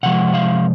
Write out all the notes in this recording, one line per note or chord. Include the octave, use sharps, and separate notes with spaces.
C3 F3 G#3 F#5
F5